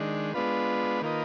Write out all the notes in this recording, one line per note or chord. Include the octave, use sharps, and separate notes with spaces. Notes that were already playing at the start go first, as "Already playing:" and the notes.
Already playing: D#3 G#3 D4
G#3 B3 D4 F4 B4
D#3 A#3 F4 B4 D#5